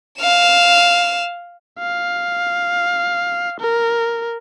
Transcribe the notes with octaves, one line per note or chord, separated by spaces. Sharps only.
F5 E7
F5
A#4